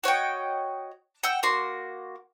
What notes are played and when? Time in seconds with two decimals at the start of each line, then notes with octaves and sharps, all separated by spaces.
0.04 F#4 C#5 D#5 G5
1.23 F#5 G5 E6
1.43 A#3 F#4 C6